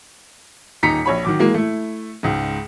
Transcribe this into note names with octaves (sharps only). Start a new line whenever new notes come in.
D#1 D#4 A#5 B6 C#7
A#1 C#5 B5
D#3 F#3 D6
E3 G#3 A#3
A3 E4
C#2 G#2